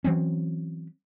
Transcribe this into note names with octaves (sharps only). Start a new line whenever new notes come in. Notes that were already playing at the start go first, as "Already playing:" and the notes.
E3 F#3 C4 C#4